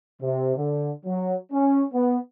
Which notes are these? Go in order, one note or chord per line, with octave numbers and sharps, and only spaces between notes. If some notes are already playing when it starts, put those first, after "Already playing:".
C3
D3
F#3
C#4
B3